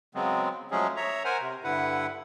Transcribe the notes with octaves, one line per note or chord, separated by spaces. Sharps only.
C#3 F#3 G#3 B3 C4
F3 F#3 G#3 A3 C#4 G#4
C#5 E5 A#5
A#4 C5 F#5 G#5
C3
G2 D3 E4 B4 F#5